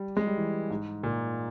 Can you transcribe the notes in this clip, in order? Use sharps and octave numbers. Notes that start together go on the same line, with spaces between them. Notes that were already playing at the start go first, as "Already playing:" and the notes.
Already playing: G3
G#3
G3
E3
G#2
A#2